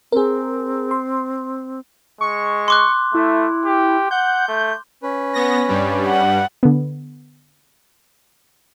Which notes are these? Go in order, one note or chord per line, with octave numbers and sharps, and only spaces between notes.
C4 G#4 A#4
C6
G#3 C#6
C6 D6 F#6
A3 E4
G4
F#5 G6
A3
C#4 B4
B3 A#6
G2 G3
F#5
D3 B3